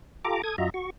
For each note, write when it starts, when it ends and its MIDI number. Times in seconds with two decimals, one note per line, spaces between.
0.25 0.42 65
0.25 0.42 67
0.25 0.42 69
0.25 0.42 82
0.25 0.42 86
0.44 0.56 69
0.44 0.56 87
0.44 0.56 92
0.58 0.70 42
0.58 0.70 65
0.58 0.70 66
0.58 0.70 75
0.58 0.70 76
0.58 0.70 82
0.74 0.90 66
0.74 0.90 85